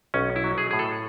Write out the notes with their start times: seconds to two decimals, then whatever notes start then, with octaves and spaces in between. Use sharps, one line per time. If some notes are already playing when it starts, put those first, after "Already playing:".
0.14 B1 C#4
0.36 E4
0.44 F#3
0.58 G#4
0.71 A2 G#4
0.79 A4